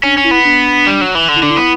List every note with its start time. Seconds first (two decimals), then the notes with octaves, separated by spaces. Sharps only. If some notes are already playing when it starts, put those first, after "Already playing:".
0.03 C#4 D4
0.18 C#4
0.24 E4
0.31 B3
0.45 D4
0.87 G3
1.01 F#3
1.15 E3
1.29 D3
1.36 E4
1.43 D3 D4
1.50 E4
1.57 B3